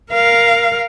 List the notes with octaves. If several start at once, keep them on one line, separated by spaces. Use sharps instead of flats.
A#4 F5